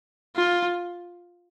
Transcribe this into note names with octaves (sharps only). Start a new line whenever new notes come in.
F4